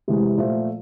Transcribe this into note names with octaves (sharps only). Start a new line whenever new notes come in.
C3 E3 G#3
A#2 F3 A3